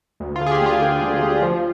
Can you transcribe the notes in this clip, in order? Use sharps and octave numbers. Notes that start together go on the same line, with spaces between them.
D2
F4
D3
G#4
G4
D2 F4
D3
D2
D2
F3